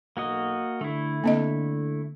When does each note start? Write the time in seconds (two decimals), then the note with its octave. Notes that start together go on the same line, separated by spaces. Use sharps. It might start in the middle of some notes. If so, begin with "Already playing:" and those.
0.17 B1 A#3 F#4 D#5
0.81 D3 A3 E4
1.24 D3 A#3 C4 D#5